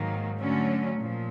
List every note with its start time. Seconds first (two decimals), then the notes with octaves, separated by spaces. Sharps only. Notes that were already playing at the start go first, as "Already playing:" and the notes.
Already playing: G#2 D#3 F#3 A#3
0.40 D3 F#3 A3 C#4
0.98 A#2 F3